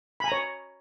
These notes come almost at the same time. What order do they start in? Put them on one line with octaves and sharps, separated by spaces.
B5 G#5 A#5 C#5